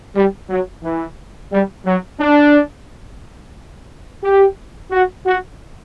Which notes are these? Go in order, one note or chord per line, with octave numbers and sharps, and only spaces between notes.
G3
F#3
E3
G3
F#3
D4
G4
F#4
F#4